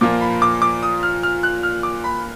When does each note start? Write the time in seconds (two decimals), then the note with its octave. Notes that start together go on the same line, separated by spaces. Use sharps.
0.01 A#2 F3 A#3 F4 D6
0.21 B5
0.42 D6
0.62 D6
0.83 D#6
1.03 F6
1.23 F6
1.43 F#6
1.63 F6
1.83 D6
2.04 B5